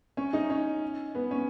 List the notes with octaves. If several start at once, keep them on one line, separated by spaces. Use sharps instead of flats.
C#4
D#4
C#4
B3
C#4